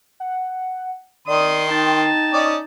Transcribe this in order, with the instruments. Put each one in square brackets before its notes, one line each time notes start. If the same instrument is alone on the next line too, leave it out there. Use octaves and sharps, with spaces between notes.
[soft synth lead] F#5
[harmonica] D#3 C6 [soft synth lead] D5 [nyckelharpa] D#6
[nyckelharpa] D#4 A5 [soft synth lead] G5
[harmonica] C#4 D5 D#5